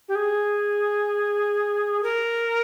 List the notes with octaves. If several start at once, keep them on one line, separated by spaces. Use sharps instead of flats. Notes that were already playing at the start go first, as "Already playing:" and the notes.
G4
G#4
A#4